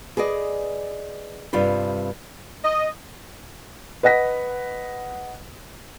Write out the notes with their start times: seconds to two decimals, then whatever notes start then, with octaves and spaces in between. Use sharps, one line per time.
0.17 G#4 B4 D5 D#5
1.53 G2 C3 F4 B4
2.63 D#5
4.03 B4 D#5 F#5 A#6 B6